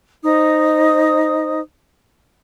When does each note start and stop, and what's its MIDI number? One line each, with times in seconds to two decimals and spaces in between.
0.24 1.60 63
0.24 1.60 72
0.24 1.60 75
0.24 1.60 87